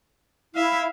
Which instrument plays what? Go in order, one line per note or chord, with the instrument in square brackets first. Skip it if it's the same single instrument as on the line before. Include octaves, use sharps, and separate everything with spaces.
[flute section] E4 [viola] E5 F5